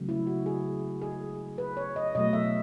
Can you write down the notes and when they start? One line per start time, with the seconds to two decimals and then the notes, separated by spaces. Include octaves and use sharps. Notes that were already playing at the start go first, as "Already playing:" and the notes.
Already playing: C#3 F#3 A3
0.09 E4
0.27 F#4
0.46 G#4
1.02 G#4
1.58 B4
1.77 C#5
1.96 D#5
2.15 B2 F#3 A3 D#5
2.33 E5